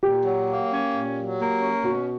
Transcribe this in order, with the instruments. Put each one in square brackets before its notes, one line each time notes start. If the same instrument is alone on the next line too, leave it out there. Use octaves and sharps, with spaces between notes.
[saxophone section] A#2 [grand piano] G4
[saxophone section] F#3
A#3
C#4
A#2
F#3
A#3
C#4
[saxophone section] B2 [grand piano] F#4